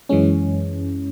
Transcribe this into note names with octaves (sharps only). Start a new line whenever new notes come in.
F#2 E3 G#3 C#4